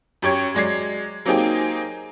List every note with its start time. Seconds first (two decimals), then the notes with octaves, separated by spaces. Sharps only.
0.22 F#2 G4 C#5 G#6
0.55 F#3 G#3 D5 G#6 C7
1.25 F#3 A#3 C4 D#4 G4 G#4